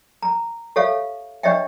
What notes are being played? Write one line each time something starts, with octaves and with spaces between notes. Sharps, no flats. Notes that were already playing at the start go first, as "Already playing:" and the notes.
A#5
G4 A4 C#5 E5 F5
D4 G4 C#5 D#5 E5 G5